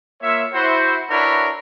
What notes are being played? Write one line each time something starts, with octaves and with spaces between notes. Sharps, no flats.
A#3 F4 C#5 E5
E4 F#4 C5
D4 E4 F#4 A#4 B4 C#5